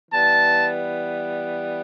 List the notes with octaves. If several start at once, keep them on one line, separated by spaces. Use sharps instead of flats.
E3 G3 B3 A5